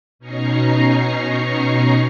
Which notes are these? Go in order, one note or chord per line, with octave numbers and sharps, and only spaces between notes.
B2 C#4 D#4 A#5 C#6 C7